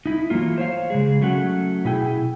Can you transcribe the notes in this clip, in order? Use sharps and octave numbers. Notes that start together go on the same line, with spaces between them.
D#4 E4
E3 F#3 A3 A#3 F4
C5 C#5 F5
C#3 G#3 G#4
F#3 A3 C#4 F#5
B2 E4 G#4 G5